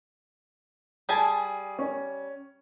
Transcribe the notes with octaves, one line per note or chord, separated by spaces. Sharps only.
G3 G#4 G#5 A5
C#4